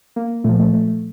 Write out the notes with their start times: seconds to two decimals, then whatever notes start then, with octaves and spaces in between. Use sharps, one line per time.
0.16 A#3
0.44 A#2 F3 A3
0.59 A3
0.74 A3
0.88 A3